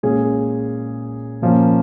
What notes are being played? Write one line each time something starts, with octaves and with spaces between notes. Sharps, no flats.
A#2 G#3 C#4 G#4
A#2 F3 A#3 C#4